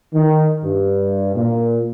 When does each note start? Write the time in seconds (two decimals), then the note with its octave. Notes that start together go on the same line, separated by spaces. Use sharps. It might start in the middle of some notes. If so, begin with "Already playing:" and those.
0.14 D#3
0.64 G2
1.35 A#2